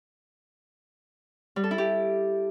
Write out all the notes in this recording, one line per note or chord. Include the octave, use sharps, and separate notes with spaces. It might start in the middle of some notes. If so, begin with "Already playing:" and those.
G3
A4
E4
G4